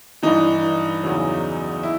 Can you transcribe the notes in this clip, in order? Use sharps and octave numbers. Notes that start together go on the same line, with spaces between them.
G2 E3 D#4
E2 C#3 F#3
E4